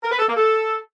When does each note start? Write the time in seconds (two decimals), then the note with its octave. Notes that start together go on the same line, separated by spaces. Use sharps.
0.03 A#4
0.11 B4
0.19 A4
0.27 A#3
0.35 A4